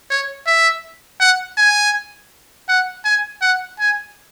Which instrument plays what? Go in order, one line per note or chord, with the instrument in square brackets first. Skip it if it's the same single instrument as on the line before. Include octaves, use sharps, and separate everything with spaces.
[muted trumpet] C#5
E5
F#5
G#5
F#5
G#5
F#5
G#5